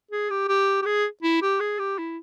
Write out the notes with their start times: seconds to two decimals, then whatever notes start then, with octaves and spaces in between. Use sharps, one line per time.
0.11 G#4
0.30 G4
0.48 G4
0.82 G4
0.86 G#4
1.23 E4
1.42 G4
1.61 G#4
1.79 G4
1.98 E4